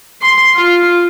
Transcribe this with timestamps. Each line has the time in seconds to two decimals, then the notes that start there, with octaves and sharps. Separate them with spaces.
0.22 C6
0.55 F4